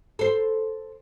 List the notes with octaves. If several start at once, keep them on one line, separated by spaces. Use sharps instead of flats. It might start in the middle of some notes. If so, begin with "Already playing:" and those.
A4 C5